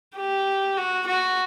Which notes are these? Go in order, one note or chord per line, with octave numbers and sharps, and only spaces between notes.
G4
F#4
F#4